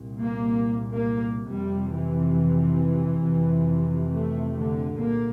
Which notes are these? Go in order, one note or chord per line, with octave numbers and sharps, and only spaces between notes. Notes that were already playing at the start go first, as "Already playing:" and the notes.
Already playing: C2 A#2
A#3
A#3
F2 C3 G3
E3
F2 C3
A3
D3
C2 A#2 A#3